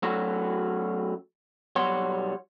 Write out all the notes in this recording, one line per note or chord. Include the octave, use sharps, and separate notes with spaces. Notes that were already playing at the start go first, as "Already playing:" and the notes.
F#3 A3 C#4 F#4
B1 F#3 G3 C#5 F#5 C6